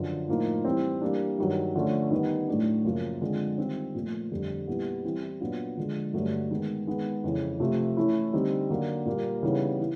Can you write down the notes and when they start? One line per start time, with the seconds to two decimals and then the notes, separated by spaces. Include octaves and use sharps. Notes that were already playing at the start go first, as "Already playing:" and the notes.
Already playing: F#2 D3 F3
0.28 A2 F3 A#3 D#4
0.65 E3 G3 C4
1.01 E3 G3 A#3 D4
1.38 G2 D#3 F#3
1.76 D3 F3 A3 C#4
2.11 D#3 G3 B3 D#4
2.48 A2 F#3 A3 D4
2.84 F#2 C#3 F3 A#3
3.21 D3 F3 G#3 C4 F4
3.58 D#3 G3 C4 F4
3.95 A#2 F3 A3
4.31 F2 D3 G3
4.67 A#2 G3 B3 E4
5.05 E3 G3 C4 E4
5.40 A#2 F#3 B3 D4 F4
5.77 D3 F3 G#3
6.14 G2 D3 F#3 A3 D4
6.51 D#3 G#3 B3
6.87 D#3 G#3 B3
7.24 F2 C#3 E3
7.60 C3 F3 A3
7.97 E3 A3 C#4 E4
8.33 D3 G3 C4 D#4
8.71 D3 F#3 A#3
9.06 A#2 G3 A#3
9.43 C#3 E3 G3 B3 D#4
9.79 E3